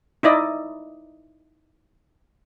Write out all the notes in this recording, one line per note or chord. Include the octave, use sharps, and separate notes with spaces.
D#4 E4 D5 D#5